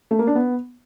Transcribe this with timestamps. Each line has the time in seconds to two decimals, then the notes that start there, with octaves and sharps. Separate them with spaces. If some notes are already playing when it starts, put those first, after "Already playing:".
0.11 A3
0.19 A#3
0.27 D4
0.35 B3